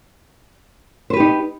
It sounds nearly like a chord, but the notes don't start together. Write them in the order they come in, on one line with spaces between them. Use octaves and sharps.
C5 B4 G4 D#4